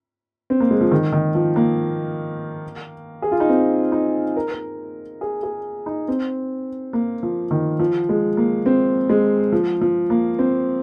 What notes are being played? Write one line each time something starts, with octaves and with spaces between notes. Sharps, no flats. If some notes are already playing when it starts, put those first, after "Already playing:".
C4
A#3
G#3
F3
D#3
D#3
F3
A#3
G#4
F4
D#4
C4
D#4
A#4
A#4
G#4
G#4
D#4
C4
A#3
F3
D#3
F3
G#3
A#3
C4
G#3
F3
F3
A#3
C4